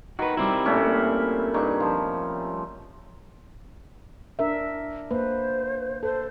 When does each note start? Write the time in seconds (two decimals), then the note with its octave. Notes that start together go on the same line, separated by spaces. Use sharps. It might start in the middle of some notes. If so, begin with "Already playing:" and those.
0.19 D#3 F#4 B4
0.37 G3 C4 E4
0.66 A#2 A3 C#4
1.54 G2 D#3 C#6
1.80 F3
4.39 D4 A#4 E5
5.11 A#3 B4 C5
6.03 A4 C5